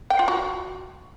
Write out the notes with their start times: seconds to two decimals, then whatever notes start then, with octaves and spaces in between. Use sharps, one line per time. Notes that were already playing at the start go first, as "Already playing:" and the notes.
0.10 G5
0.19 F4
0.28 F#4